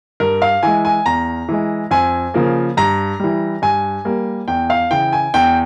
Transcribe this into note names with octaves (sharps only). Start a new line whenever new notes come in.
G2 A#4
F5
E3 G#3 G#5
G#5
E2 A#5
E3 G#3
F2 G#5
C#3 F3 A#3
G2 A#5
E3 G3
G2 G#5
G3 A#3
E2 G5
F5
C#3 E3 G5
G#5
E2 G5